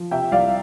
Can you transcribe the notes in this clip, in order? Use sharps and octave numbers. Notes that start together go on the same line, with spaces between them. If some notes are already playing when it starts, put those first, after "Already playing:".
Already playing: F3
C3 E5 G5
C2 D5 F5